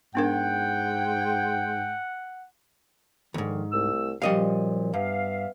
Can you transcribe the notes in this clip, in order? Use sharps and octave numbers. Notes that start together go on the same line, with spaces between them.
G#2 B3 D4 A#4 F#5 G5
D#2 G#2 D3 D#3 F3
C2 A3 E6
F#2 A#2 F3 G3 D#5 F5
G2 B3 E5 F5